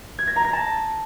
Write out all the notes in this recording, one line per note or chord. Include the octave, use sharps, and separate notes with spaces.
G#6
A#6
A#5
A#6
A5